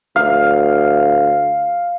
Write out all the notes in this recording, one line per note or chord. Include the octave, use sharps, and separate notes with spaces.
D2 F5